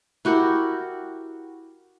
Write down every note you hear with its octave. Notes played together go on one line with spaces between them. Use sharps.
E4 F#4 G4 A#4